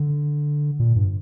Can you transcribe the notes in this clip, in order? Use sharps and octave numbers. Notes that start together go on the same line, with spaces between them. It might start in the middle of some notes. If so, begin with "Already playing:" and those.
Already playing: D3
A#2
G2